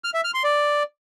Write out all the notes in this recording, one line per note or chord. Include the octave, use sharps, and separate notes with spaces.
F6
E5
F6
C6
D5